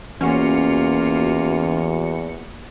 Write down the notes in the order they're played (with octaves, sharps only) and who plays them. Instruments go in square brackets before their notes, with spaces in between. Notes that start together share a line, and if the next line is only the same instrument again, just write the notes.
[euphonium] E2 [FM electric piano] E3 F#4 C#7 [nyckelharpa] A#3 F4 [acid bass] C#4